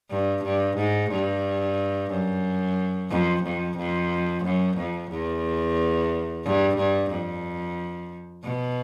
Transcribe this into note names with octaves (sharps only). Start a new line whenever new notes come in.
G2
G2
G#2
G2
F#2
F2
F2
F2
F#2
F2
E2
G2
G2
F2
B2